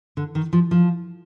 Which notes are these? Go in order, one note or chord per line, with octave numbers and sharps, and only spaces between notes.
D3
D#3
F3
F3